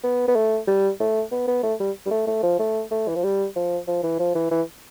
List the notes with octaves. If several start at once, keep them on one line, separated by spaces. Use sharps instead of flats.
B3
B3
A3
G3
A3
B3
B3
A3
G3
G3
A3
A3
F3
A3
A3
E3
F3
G3
F3
F3
E3
F3
E3
E3